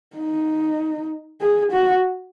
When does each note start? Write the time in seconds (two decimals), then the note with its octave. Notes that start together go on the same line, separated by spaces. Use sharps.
0.17 D#4
1.41 G#4
1.72 F#4